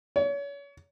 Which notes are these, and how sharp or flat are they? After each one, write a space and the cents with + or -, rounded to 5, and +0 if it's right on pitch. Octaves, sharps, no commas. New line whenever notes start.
C#5 +35